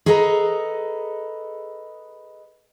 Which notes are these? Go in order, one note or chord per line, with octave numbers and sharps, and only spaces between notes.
G#4 A4 B4 D#5 E5 A#5